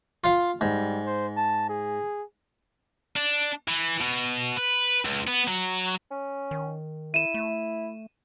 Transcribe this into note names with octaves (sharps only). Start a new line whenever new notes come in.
F4 F5
G#2 G3
C5
A5
G#4
D4
E3
B2
B4
C#2
B3
F#3
C#4
D#3
E4 D#7 E7
A3